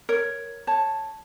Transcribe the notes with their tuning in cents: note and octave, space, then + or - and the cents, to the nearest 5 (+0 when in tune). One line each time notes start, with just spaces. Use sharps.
A#4 +0 C#5 +0
C#5 -10 A5 +0